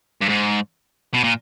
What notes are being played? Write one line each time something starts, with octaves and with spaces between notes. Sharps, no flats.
G2
G#2
B2
A#2